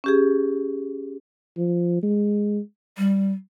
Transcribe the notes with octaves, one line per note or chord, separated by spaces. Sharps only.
C#4 G4 G#4
F3
G#3
G3